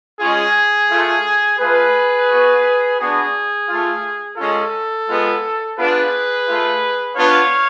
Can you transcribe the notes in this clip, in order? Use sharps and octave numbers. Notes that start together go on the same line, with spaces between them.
G#3 C#4 F4 G#4
A3 F4
A3 F4 G#4 B4
B3 F#4
B3 D4 F#4 G#4
A3 F4
G#3 C#4 F4 A4
G#3 B3 F4
B3 D4 F4 G#4 B4
A3 F4
B3 D4 F4 C#5 F5